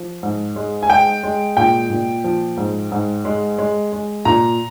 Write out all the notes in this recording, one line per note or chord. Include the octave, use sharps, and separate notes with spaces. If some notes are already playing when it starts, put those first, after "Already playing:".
Already playing: F3
G#2
G#3
G#5
G#3 G5
G#3
A#2 G5
A#2
F3
G#2
G#2
G#3
G#3
G#3
A#2 A#5